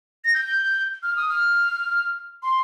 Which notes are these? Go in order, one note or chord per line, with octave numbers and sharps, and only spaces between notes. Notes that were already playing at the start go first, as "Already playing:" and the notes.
A#6
G6
F6
D#6
F6
C6